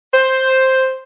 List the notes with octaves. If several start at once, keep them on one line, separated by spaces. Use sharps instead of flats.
C5